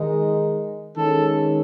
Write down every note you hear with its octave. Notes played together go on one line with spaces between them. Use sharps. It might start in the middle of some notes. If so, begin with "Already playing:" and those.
Already playing: D#3 G#3 D#4
D#3 G#3 C#4 A4